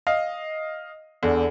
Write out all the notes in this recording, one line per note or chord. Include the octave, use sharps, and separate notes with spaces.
D#5 F5
E2 D3